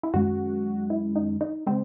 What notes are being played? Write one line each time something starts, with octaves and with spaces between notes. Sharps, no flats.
E4
F#2 D#3 G#3 F#4
E4
D#4
D#4
C#3 G#3 C4